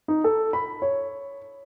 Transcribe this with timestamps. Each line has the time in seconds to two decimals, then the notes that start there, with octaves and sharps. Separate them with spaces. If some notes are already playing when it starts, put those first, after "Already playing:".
0.08 D#4
0.24 A4
0.53 B5
0.82 C#5